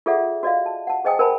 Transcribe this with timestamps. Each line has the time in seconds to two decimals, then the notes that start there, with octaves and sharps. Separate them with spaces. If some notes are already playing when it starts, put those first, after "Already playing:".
0.06 F4 G#4 A4 D5 E5 F#5
0.43 F#4 D5 D#5 F5
0.66 A5
0.87 F#5 A5
1.04 G#4 C5 D#5 G5 G#5 D#6
1.19 A#4 C5 F#5 G#5 A5 B5